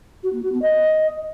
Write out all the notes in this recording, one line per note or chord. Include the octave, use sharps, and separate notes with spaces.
F#4
A#3
F#4
B3
D#5